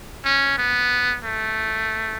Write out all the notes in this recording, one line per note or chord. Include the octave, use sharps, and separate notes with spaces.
C#4
B3
A3